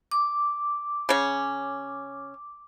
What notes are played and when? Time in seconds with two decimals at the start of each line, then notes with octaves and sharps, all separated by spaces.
0.11 D6
1.09 C#3 C#4